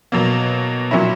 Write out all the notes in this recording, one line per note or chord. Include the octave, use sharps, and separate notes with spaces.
B2 F#3 A#3
A#2 F#3 C#4 E4